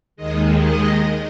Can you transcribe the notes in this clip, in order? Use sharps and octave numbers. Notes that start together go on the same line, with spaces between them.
D#2 D#3 G#3 D#5
D#5